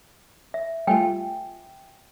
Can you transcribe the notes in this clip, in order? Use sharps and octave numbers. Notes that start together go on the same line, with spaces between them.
E5
G3 A3 F4 G5 G#5